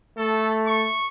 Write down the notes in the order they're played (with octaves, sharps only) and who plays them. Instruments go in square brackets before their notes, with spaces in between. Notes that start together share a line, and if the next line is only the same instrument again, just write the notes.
[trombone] A3 [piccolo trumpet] A4
[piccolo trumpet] C#6